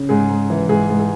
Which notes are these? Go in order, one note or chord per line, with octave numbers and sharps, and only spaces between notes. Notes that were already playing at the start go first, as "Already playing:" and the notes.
Already playing: C#3
G#2 G#4
G#2
E3
G#2 G#4
G#2
G#4